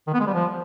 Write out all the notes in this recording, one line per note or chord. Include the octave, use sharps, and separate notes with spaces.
D#3
B3
G#3
G3
F3